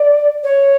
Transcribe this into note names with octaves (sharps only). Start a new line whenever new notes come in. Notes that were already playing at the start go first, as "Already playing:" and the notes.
Already playing: D5
C#5